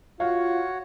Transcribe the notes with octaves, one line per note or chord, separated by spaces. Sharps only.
F4 F#4 C#5 F5